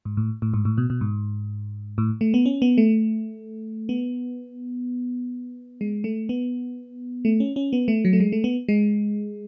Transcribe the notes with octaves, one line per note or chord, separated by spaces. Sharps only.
G#2
A2
A2
G#2
A2
B2
B2
G#2
A2
A3
B3
C#4
B3
A3
B3
G#3
A3
B3
A3
C#4
C#4
B3
A3
F#3
A3
G#3
A3
B3
G#3